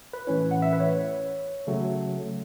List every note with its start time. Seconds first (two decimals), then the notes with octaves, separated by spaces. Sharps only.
0.13 B4
0.27 A2 E3 A3 C#4 E4 C#5
0.51 F#5
0.62 E5
0.73 B4
0.80 C#5
1.67 C#3 F#3 A3